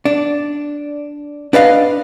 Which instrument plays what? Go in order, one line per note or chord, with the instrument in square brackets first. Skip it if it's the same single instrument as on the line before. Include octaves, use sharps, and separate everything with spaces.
[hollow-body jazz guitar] D4
D4 B4 D#5 F5